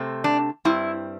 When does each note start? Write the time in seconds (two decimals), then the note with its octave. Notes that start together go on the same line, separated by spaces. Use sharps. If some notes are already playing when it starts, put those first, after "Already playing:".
Already playing: C3 A3 C4
0.24 D4
0.65 G2 G3 C4 E4